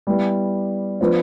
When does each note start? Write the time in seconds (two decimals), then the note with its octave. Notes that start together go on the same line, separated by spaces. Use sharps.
0.07 G3 B3 E4
1.01 F3 B3 D4 F4 C5